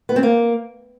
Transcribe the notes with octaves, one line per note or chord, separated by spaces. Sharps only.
B3
C4
A#3